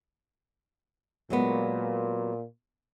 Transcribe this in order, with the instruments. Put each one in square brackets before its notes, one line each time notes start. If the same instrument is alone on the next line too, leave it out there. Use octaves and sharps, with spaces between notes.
[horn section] A#2 [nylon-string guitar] F#3 G#3 B3